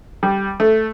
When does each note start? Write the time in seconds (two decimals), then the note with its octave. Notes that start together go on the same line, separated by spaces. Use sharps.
0.23 G3
0.60 A3